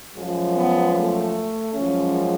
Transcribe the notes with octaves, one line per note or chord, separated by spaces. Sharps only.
F#2 F3 G#3
B3
A3
F#2 F3 G#3 C#4